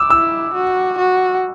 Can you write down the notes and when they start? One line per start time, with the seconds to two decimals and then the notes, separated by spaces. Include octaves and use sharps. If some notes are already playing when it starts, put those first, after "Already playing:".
Already playing: D6 E6
0.10 E4 E6
0.54 F#4
0.98 F#4